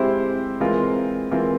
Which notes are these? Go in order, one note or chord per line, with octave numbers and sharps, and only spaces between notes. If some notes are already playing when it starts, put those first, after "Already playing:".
Already playing: G#3 C4 E4 G4 C5
E3 G#3 C4 F4 A#4
E3 G#3 C4 F4 A#4